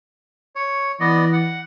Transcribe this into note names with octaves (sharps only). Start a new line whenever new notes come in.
C#5
E3 B3 D5 D#5
F#5